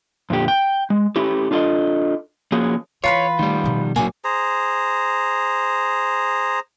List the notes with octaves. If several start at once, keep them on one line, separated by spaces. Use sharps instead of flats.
F2 A#2 D3 G4
G5
G#3
A3 C#4 E4 G4
D4 F4 A4 D#5
F3 A#3 C#4 F#4 G#4
E3 F4 B4 C#5 B5
D#3 G3 A3
B2 F3
A#1 F#3 A#3 G#5 D6
G#4 C5 A#5